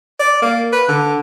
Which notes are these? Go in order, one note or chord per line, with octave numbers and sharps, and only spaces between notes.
D5
A#3
B4
D3